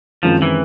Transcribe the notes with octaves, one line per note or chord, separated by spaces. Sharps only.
F#2 D#3 F3 G#3 C4
E3